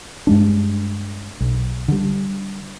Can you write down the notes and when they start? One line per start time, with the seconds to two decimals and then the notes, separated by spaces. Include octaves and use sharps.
0.27 G2 G#3 D4
1.41 B1
1.88 D3 G3